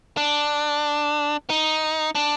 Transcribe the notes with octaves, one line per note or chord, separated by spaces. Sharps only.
D4
D#4
D4